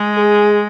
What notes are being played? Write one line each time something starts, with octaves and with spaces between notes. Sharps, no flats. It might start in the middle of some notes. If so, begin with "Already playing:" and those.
Already playing: G#3
G#4